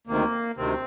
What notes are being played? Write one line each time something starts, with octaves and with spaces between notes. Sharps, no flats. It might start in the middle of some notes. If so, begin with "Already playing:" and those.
D2 C3 D#3 A#3
D2 C3 D#3 C4